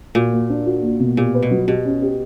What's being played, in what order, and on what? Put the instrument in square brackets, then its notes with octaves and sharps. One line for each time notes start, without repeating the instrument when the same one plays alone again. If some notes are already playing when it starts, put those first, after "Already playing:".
[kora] A#2 [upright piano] F#4
[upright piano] A#3
D4
F#4
A#3
B2
[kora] A#2 [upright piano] G4
[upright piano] B4
[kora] B2
[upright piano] F#3
[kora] B2 [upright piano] G4
[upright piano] C#4
G4